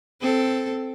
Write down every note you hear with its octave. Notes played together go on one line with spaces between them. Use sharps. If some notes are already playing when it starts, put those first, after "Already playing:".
C4 A4